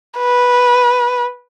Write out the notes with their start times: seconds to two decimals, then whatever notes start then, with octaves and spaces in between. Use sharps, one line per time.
0.18 B4